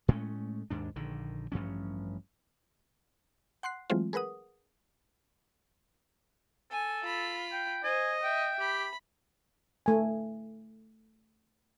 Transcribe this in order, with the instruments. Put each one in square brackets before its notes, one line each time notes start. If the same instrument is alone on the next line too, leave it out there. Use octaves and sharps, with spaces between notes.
[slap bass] A2 G#3 A3 C#4
D#2 G#2 D4
A#1 D3 D#3
A1 G2 F3 C#4
[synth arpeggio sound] F#5 C6 F#6 C7
E3 F#3 G#3 A3 C4 F4
G#4 A#4 B4 F#5 D#6
[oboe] A4 [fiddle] G#5
[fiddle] F4 B5
[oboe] G5
[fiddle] C5 [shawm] D#5 [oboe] G#5
[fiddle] E5 [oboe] G5
[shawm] G4 [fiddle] B5
[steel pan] A3 G#5